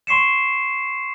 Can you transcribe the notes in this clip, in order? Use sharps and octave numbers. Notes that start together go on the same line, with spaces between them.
C6 C#6 C7 C#7 E7